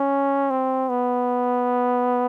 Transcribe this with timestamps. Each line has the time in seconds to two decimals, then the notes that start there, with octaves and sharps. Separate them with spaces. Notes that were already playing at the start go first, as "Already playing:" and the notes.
Already playing: C#4
0.50 C4
0.89 B3